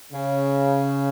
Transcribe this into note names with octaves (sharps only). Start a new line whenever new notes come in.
C#3